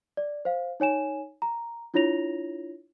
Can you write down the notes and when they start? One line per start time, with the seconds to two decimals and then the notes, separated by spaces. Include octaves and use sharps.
0.17 D5
0.45 C5 F5
0.80 D#4 C#5 G#5 E7
1.42 A#5
1.94 D4 E4 F4 C#5 A#6 F7